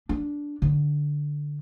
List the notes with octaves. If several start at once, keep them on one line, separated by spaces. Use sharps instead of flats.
D4
D3